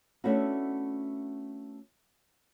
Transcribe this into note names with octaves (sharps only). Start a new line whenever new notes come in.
A3 B3 C#4 D4 E4 F#4